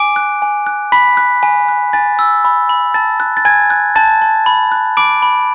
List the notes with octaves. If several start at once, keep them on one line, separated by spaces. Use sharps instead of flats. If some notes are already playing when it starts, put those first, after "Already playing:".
Already playing: G#5 D6 D7
F#6
G#5
F#6
B5 B6
F#6
G#5
F#6
G#5 A6
E6
B5
B5
A5 A6
F#6
A6
G#5 G#6
F#6
A5 A6
A5
B5
F#6
B5 D6 D7
B5